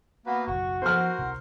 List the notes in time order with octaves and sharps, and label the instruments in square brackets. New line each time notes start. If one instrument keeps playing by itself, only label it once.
[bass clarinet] A#3 [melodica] B3 F#4 B4
[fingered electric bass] F#1 B1 [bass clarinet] F#4 [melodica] C#6
[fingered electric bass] F3 B3 [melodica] A#4 F#5 [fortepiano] C5 F6
[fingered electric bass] C2 C3